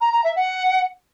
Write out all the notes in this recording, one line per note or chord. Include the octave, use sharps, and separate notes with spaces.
A#5
A#5
E5
F#5